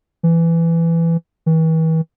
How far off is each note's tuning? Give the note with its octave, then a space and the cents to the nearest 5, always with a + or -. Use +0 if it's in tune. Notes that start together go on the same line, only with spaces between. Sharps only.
E3 +15
E3 -40